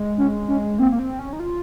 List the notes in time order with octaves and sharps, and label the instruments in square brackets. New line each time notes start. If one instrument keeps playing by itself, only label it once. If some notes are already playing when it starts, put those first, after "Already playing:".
Already playing: [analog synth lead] G#3
[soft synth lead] C#4
C#4
[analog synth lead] A#3 [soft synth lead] C4
[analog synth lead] A#3
C4
C#4
D#4
F4